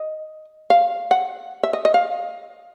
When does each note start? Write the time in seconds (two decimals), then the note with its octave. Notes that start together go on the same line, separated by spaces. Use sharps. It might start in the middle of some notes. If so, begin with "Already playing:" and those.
Already playing: D#5
0.70 F5
1.11 F#5
1.63 E5
1.73 D#5
1.85 D#5
1.94 F5